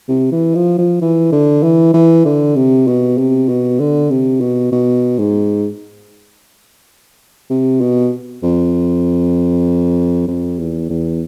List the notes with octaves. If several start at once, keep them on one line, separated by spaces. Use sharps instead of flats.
C3
E3
F3
F3
E3
D3
E3
E3
D3
C3
B2
C3
B2
D3
C3
B2
B2
G#2
C3
B2
F2
F2
E2
E2